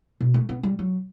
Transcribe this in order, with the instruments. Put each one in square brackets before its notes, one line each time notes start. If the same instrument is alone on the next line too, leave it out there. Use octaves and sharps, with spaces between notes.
[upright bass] B2
A3
B3
G3
F#3